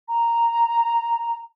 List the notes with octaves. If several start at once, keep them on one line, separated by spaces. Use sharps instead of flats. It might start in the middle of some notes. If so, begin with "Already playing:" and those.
A#5